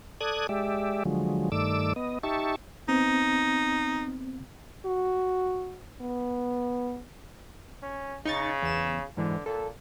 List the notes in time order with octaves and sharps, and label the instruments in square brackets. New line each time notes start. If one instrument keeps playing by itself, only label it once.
[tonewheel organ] A4 D5 D#6 F#6 G#6
G#3 G4 D5 E5
D3 F3 F#3 G#3
G2 D#3 A3 D5 D6 E6
B3 D#5
D#4 G4 E5 A5 C#6
[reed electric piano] B3 C4 [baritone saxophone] D#4
[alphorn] F#4
B3
[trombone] C#4
[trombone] C#3 [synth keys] D#4 C#6 A6
[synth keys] E2 E7
[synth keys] G#2 E3 [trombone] D3
[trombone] A#2 [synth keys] A4